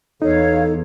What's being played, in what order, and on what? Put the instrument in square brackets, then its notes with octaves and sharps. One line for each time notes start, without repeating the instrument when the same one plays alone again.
[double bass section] E2 [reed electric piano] D#4 [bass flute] A4 [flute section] C#5 F5